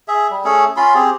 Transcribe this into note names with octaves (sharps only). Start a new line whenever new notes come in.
G#4 E5
G3
A3 C#4 G#4 A4
C#4 F4 B5 C6
C4 G4 G#4